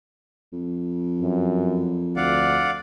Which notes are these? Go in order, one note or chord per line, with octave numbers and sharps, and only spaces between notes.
F2
F#2
D2 D5 F5 F#5